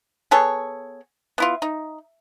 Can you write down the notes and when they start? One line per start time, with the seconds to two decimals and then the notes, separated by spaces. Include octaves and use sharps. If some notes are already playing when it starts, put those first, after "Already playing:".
0.31 B3 G#4 A4 C#5
1.38 B3 E4 F4
1.62 D#4